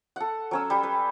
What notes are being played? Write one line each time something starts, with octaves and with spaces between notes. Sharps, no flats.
A4 F#5
F#3 C#4 E6
G3
B4